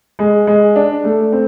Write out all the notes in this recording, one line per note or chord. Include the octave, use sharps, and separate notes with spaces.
G#3
G#3
D4
A3
C4